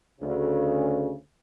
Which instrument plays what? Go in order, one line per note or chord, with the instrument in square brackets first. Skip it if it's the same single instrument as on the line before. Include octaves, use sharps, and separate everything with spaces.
[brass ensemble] D2 C#3